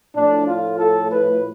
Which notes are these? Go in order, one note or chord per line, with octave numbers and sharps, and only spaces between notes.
A2 F3 A3 D4
F4
A4
B4